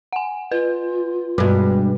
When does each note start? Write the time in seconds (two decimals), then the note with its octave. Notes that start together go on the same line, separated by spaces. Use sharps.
0.13 F#5 G#5
0.52 F4 B4
1.38 G2 B2 G3 G#3 F#4 B4